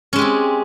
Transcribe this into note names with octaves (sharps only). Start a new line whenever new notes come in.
G#3 C4 C#4 G4